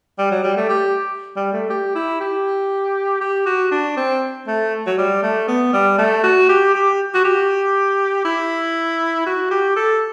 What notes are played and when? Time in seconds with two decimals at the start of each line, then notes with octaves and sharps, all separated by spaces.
0.19 G3
0.31 F#3
0.44 G3
0.57 A3
0.69 G4
1.36 G3
1.53 A3
1.70 G4
1.95 E4
2.21 G4
3.21 G4
3.46 F#4
3.71 D4
3.97 C4
4.47 A3
4.86 F#3
4.98 G3
5.23 A3
5.48 B3
5.73 G3
5.98 A3
6.24 F#4
6.49 G4
6.74 G4
7.15 F#4
7.25 G4
8.25 E4
9.26 F#4
9.51 G4
9.77 A4